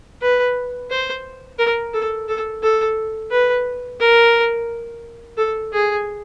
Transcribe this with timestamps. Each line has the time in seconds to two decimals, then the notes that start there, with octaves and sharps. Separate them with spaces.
0.22 B4
0.90 C5
1.59 A#4
1.94 A4
2.28 A4
2.63 A4
3.31 B4
4.00 A#4
5.37 A4
5.73 G#4